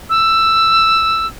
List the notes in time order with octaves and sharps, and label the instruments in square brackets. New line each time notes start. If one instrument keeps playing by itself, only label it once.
[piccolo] E6